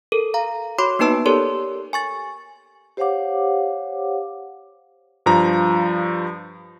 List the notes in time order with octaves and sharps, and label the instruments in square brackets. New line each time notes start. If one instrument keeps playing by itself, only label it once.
[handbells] A4 A#4
F5 A#5
F#4 C#5 B5 C6 D6
A#3 B3 D#4 B4 A5 E6
G4 A4 A#4 C#5 D5 C6
G#5 C#6 A6
[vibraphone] G4 C5 C#5 F5 F#5 D6
[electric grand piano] G2 F3 A#5